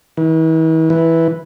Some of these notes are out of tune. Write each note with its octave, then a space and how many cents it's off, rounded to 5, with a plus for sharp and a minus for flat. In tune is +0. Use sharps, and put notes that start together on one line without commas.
E3 -40
E3 -5